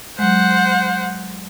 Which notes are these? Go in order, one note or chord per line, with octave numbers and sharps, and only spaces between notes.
F#3 G#3 C5 F#5